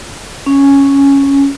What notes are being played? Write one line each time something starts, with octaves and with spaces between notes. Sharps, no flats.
C#4